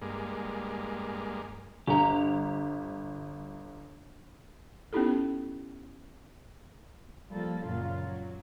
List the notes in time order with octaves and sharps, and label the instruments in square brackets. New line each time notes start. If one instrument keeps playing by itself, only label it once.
[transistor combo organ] G2 G#3 A#3
[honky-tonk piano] G1 [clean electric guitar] G4 A#5
[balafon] B3 C#4 D#4 E4 G4 A4
[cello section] F3 G3 A#3 F4 A4
F#2 A#2 C#3 F#3 F4
F#3